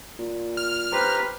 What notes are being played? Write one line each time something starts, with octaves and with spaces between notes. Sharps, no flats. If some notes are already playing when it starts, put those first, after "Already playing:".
A#2
F6
G4 B4 C5 A#5